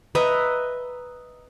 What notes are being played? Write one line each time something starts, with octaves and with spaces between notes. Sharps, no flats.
B4 D#5 E5 A#5